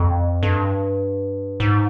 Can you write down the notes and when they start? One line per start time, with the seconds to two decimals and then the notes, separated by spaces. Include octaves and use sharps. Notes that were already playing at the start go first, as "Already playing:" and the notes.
Already playing: F2
0.43 G2
1.60 G#2